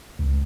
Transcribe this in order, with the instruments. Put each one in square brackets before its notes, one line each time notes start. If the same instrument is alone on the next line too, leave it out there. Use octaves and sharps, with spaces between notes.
[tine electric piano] C#2